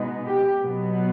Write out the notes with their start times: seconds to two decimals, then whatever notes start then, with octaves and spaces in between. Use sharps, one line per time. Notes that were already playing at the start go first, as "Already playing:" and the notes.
Already playing: B2 G#3 B3 D#4
0.26 G4
0.63 B2 F#3 B3